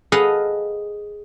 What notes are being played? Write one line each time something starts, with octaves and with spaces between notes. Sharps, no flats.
G#4 A4 B4 D#5 F5 F#5